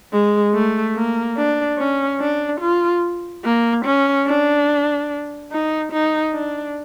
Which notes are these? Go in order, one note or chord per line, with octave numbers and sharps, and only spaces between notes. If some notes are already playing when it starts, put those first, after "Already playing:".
G#3
A3
A#3
D4
C#4
D4
F4
A#3
C#4
D4
D#4
D#4
D4